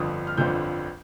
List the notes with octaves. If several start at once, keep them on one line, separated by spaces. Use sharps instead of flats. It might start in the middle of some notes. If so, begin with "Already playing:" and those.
Already playing: G1 F2 D3 F3 D#6
F6
G1 F2 D3 F3 G6